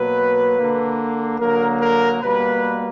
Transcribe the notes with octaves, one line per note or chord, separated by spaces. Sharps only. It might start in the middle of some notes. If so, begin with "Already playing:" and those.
Already playing: B2 F#3 A#3 B4
D3 A#3
D3 F#3 A#3 A#4
A#4
B2 G3 A#3 B4